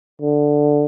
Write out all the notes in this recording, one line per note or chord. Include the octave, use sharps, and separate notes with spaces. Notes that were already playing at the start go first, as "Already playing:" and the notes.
D3